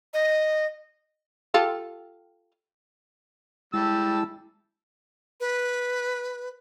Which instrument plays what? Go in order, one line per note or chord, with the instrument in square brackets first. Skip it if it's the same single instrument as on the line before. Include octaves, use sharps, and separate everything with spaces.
[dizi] D#5
[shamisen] F4 G4 A4
[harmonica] G3 E6 [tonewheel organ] G#3 E4 A5
[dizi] B4